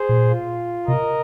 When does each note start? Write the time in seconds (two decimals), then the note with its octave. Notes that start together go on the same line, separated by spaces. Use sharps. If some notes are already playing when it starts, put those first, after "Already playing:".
Already playing: G#4 C5
0.09 A#2
0.29 F4
0.87 C3 A#4 D#5